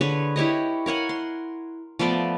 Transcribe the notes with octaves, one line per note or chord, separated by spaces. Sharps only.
D3 G#4 B4 C#5
E4 G4 C#5 D#5
A#4 C#5 F#5 G#5
C6
F3 A3 B3 D5